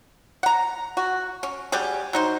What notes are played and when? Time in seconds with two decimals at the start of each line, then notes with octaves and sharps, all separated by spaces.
0.43 F#5 A#5
0.97 F#4
1.43 C#4
1.72 F#3 G3 G4 G#4
2.13 F#3 D#4 C5